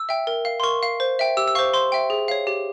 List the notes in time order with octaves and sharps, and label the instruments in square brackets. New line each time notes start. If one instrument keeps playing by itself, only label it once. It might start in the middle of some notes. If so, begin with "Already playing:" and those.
Already playing: [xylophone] E6
E5 G5
A#4
F5
C6
A#4 C#6
F5
C5
E5 G5
G4 E6
E6
C5 F5 C#6
C5 C6
E5 G5
G#4
C#5 F5
G4